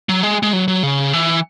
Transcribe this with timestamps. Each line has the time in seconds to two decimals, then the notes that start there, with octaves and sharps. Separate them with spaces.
0.09 F#3
0.23 G#3
0.43 G#3
0.53 F#3
0.68 F#3
0.83 C#3
1.13 E3